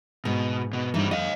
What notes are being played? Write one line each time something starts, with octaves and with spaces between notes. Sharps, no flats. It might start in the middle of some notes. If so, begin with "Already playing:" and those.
G#2 B2
B2
G2 E3 G3 D#4
F2 D#5 F5